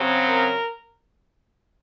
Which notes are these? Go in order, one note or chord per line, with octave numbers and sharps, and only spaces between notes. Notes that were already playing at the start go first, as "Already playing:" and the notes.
Already playing: C#3 F#3 C4
A#4